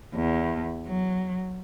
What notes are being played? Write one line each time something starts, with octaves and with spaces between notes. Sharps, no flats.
E2
F#3